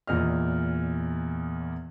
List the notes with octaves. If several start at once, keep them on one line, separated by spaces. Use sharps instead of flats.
E2 A#2 D#5 F6